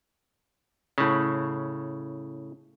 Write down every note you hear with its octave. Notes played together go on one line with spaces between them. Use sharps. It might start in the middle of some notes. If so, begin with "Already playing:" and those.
A2 C#3